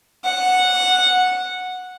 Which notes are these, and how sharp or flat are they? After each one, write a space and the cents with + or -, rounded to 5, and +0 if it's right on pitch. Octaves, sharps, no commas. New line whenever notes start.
F#5 -10